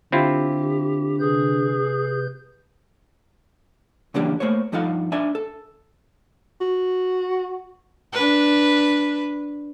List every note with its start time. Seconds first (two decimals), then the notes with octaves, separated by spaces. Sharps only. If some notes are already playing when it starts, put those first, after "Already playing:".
0.12 D3 C4 E4 F4 G4
1.19 C3 G#4 B4 G6
4.14 C#3 E3 F#3 A#3 D4 G4
4.40 A3 A#3 C5 C#5
4.72 G2 F3 D#4 A4 F5 F#5
5.12 D4 E5 G#5
5.35 A4
6.61 F#4
8.13 D4 B4